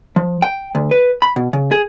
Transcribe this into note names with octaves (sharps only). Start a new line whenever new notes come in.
F3
G5
D2
B4
B5
B2
C#3
G#4